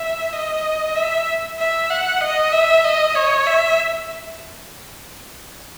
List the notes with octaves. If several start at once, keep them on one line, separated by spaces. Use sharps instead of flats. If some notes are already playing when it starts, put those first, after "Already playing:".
Already playing: E5
D#5
E5
E5
F#5
D#5
E5
D#5
C#5
E5